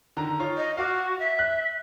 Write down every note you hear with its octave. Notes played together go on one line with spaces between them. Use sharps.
D3 D#3 A#5
D#4 F4 C#5
D#5
F#4 F5 F#5 D6
E5
F#6